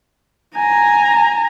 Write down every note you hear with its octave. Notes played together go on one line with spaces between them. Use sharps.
G#5 A#5